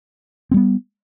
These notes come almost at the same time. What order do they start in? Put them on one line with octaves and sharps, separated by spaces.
C4 G3 B3